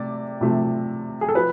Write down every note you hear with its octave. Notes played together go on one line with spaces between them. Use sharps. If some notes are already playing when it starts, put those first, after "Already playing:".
Already playing: C3 A3 D5
C3 F3 A3
G#4
A4
F3 B4